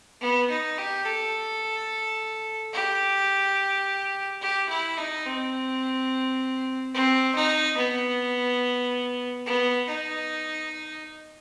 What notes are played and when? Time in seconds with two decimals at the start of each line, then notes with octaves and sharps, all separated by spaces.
0.21 B3
0.50 D#4
0.78 G4
1.05 A4
2.73 G4
4.42 G4
4.69 E4
4.97 D#4
5.26 C4
6.94 C4
7.36 D#4
7.78 B3
9.46 B3
9.89 D#4